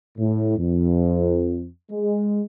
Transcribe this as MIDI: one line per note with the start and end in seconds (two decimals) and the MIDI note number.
0.18 0.56 45
0.57 1.68 41
1.91 2.42 56